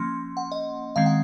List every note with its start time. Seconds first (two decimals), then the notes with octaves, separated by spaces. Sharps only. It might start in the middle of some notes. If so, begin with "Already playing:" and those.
Already playing: F3 A#3 C#4 C6
0.37 F#5
0.52 D#5
0.96 D#3 G#3 C4 F5
1.06 F#5